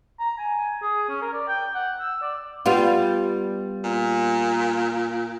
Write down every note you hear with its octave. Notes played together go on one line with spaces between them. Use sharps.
A#5
G#5
G#4
C#4
A#4
D5
G5
F#5
E6
D5
G3 B3 F4
A#2